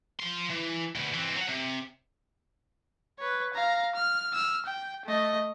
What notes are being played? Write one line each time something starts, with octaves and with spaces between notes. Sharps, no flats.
F3 C6
E3
D2 B2
E3 C4
F#3 F#5
C3
B4 C#5
F5 A#5
F6
E6 F6
G5
A3 D#5